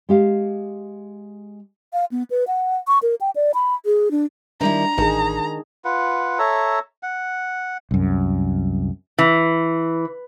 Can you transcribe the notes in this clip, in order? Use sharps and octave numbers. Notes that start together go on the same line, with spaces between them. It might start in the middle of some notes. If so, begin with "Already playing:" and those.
G#3 G4 F5
F5
B3
B4
F#5
C#6
A#4
G5
D5
B5
G#4
D4
D#3 G3 D4 E4 A#5
A1 D#3 D#4 G#4 A5
F4 B4 F#5
A4 C#5 E5 A#5
F#5
C2 F#2
E3